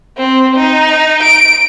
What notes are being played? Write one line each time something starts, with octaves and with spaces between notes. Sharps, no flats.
C4
D#4
D7